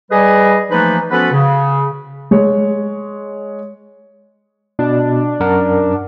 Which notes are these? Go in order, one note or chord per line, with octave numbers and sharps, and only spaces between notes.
G3 G#4 B4 D#5
E3 F3 A3 A#3 D#4 B4
F3 B3 C#4 F#4 A4 B4
C#3
G#3 C#5
B2 D4
F#2 A#4 F#5